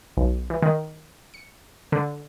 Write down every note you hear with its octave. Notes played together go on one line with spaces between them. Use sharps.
B1
E3
D#3
C#7
D3